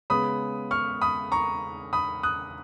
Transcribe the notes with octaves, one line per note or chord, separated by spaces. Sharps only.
C#3 G#3 B3 B5 D#6
C#6 F6
B5 D#6
A#5 C#6
B5 D#6
D#6 F#6